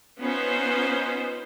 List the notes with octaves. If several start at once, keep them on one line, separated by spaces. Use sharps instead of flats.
B3 C#4 D#4 F4 B4 C5